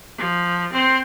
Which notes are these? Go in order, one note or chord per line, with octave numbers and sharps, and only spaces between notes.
F3
C4 C5